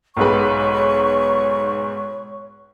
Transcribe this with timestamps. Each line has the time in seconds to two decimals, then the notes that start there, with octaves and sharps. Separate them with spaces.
0.17 B1 G#2 B4 C#5 C#6